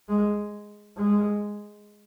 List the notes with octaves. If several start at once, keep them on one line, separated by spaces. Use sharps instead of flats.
G#3
G#3